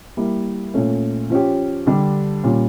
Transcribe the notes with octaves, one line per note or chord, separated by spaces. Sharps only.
G3 A#3 E4
A#2 A3 C#4
F3 C#4 G4
D3 G3 D4 G4
A#2 G3 C#4